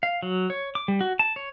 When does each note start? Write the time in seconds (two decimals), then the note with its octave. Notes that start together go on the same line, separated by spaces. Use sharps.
0.03 F5
0.23 F#3
0.50 C#5
0.75 D6
0.88 G3
1.01 F#4
1.19 A5
1.36 C#5